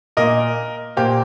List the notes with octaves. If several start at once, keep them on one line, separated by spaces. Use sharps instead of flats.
A#2 A#3 A#4 D#5
A#2 A#3 G4 C5